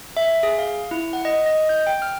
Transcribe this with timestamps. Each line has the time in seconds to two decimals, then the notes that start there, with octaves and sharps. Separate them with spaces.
0.17 E5
0.43 G#4
0.58 F5
0.91 E4
1.13 F#5
1.25 D#5
1.46 D#5
1.69 G6
1.86 G5
2.02 F6